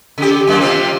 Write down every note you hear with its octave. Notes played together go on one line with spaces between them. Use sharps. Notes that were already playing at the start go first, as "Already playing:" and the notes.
C#3 G4
F#2 G#3 A#3
C3 C4 F4